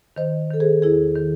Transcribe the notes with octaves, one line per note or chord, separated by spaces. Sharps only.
D#3 C5 D#5
D#3 A4
G#4 C5
E2 E4 G#4
D#3